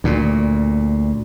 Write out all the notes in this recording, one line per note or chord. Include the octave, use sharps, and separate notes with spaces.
D2 A#2